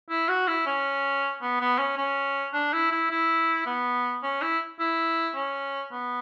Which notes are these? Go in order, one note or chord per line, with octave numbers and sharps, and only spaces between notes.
E4
F#4
E4
C#4
B3
B3
C#4
C#4
D4
E4
E4
E4
B3
C#4
E4
E4
C#4
B3